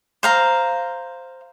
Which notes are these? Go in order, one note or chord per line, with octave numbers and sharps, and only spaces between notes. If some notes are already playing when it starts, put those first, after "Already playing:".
C5 F5 A#5